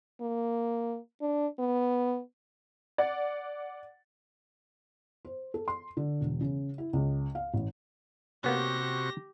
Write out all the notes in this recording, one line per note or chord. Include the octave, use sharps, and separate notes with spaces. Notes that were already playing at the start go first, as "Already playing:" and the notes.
A#3
D4
B3
D5 F#5
C5
A4
C6
D3
E1
C#3
E4
C#2
F5
A1
C3 A#3 B3 C#4 F#4 G4 C#6 A#6